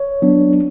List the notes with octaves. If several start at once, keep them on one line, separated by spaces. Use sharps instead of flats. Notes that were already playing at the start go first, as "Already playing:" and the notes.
Already playing: C#5
F#3 B3 D4